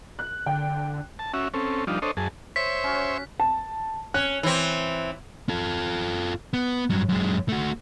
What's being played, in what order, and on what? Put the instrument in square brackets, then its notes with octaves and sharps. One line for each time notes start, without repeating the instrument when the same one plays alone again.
[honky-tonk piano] F#6
[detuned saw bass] D3 [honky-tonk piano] G5
[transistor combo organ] A5
C#4 F#4 E5
C4 C#4 A4
F3 G3 D4 D#4 F4
D4 A4 C5 C#5 D#5
F#2 G#4 A5
[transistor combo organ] C5 C#5 E5 [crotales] B6
[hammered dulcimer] C#4 F#4
[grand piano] A5
[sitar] C#4 [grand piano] F#6
[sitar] E3 C4
[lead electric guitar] F4 A4
B3
G2 F#3
F#2 G#3
A3 F#4